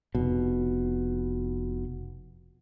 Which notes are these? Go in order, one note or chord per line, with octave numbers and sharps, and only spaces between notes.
F1 B2